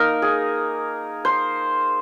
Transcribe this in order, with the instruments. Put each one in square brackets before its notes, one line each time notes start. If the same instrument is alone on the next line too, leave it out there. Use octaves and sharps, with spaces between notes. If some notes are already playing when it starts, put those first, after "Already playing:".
Already playing: [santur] A#3 D#4 A#4
G#4
C5